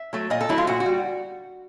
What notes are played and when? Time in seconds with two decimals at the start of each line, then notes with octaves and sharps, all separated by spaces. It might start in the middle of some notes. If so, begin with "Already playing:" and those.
Already playing: E5
0.13 F#3 A3
0.30 A#2 D#5
0.41 A4
0.49 F#3 A3 E4
0.58 F4
0.67 A#2 F#4
0.80 F#4
0.86 G3